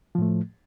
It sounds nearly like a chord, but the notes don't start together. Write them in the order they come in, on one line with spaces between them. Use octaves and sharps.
F3 A2 A3